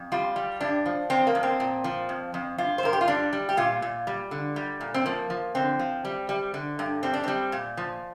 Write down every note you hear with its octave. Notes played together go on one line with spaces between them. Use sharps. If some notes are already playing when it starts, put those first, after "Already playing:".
Already playing: F2
G3 F4
G3
G2 D4
F3
F2 C4
A#3
F2
C4
A#2
F3
F2
F2
G2 F4
C5
G2 A#4
G4
F4
G3 D4
G3
G4
A#2 F4
A#2
G3
D3
G3
A#2
C4
F3 A#3
F3
D3 C4
F3
G3
G3
D3
G2
G3 C4
D4
G3 C4
A#2
F3